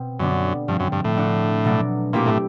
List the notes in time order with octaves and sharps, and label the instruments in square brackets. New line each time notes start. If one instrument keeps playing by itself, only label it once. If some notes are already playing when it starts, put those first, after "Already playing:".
Already playing: [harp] B2 C4
[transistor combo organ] F#2 [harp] D3 G3 B3 D4
[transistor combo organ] G2 [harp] F3 A3 C4
[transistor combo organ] F#2
G2
A2
[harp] A3 D4 F#4
B2 F#3 A3 D4
[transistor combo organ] A#2 [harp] A3 C4 E4 G4
[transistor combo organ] A2